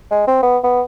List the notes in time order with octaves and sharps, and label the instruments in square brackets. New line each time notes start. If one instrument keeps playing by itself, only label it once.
[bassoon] G#3
C4
B3
B3